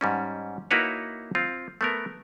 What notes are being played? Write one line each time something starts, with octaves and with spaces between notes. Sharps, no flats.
G#2 G3 C#4
A#3 D#4 E4 F#4 B4 C#5
C4 F4
A3 B3 A#4